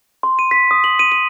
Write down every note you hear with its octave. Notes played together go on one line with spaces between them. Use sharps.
C6
D#7
B6
D#6
F#7
D#7
D#7